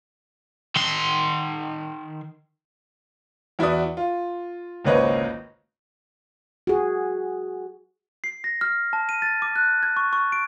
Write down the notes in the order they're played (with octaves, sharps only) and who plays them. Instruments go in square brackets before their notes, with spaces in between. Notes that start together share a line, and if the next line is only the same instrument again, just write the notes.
[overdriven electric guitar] D#3 C6
[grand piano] E2 E4 F#4 D5 D#6
F4
G#1 C#2 A#3 B4 C#5 D#5
[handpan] F#4 G#4
[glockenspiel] C7
A#6
F6
A5
D#7
A6
D6
F#6
G#6
C#6
C#6
D7